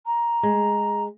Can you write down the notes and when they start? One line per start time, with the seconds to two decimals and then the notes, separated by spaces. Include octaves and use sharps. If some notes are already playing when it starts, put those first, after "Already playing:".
0.06 A#5
0.43 G#3